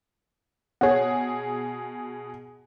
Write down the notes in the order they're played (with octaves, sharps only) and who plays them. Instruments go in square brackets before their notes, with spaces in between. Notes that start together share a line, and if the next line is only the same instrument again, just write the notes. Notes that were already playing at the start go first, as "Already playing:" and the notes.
[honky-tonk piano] B2 G#4 [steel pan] C#5 F#5